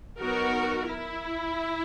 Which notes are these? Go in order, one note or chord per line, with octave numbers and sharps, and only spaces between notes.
F#3 B3 D#4 F#4 A#4
E4